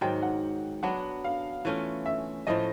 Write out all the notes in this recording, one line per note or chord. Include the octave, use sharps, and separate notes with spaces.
G#2 D#3 F#3 G5
F#5
F#3 B3 D4 F#4 F#5
F5
E3 A3 C#4 F4
E5
A2 F3 A3 D#5